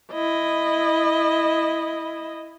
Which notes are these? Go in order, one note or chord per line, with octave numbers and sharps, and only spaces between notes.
E4 D#5